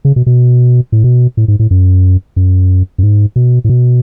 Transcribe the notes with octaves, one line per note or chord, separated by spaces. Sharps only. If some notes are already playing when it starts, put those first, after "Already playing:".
C#3
B2
B2
A2
B2
A2
G#2
A2
F#2
F#2
F#2
G#2
B2
A2
B2